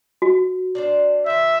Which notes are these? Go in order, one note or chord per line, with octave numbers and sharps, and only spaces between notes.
F#4
D4 C5 D5
D#3 C5 E5